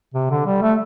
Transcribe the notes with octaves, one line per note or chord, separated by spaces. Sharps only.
C3
D3
G3
A3